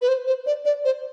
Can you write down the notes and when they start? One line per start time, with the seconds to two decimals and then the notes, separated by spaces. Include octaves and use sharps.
0.02 B4
0.08 C5
0.27 C5
0.46 D5
0.65 D5
0.85 C5